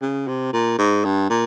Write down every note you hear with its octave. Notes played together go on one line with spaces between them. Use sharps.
C#3
C3
A#2
G#2
G2
A#2